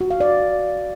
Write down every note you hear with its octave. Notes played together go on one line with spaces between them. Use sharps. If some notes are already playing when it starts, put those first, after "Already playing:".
F#4
F5
D5